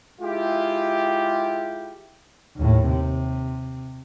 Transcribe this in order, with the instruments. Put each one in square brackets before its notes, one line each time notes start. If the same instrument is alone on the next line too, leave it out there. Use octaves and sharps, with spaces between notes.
[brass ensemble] G#3 E4 F4 G4
[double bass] D#2 A2
C3